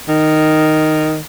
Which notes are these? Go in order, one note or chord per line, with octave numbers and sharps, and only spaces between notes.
D#3